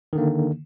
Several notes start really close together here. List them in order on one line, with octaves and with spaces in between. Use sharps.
D#3 D3 A#3